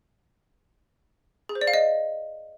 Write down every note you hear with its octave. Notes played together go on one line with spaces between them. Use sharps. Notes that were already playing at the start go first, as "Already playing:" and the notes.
G#4
C5
D5
F5
D#5